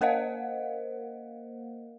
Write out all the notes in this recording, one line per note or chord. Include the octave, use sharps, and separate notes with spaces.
A#3 A#4 C5 D#5 F5 F#5